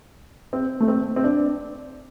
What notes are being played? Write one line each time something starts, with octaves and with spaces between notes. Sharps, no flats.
C4
A3
C4
C4
D4